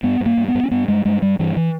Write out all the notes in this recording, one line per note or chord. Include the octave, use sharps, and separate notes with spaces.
G2 B3
G2
A#3
G2
B3
G2
C#4
G2 B3
G2 G#3
G2 G#3
G2 G3
G2 E3
E3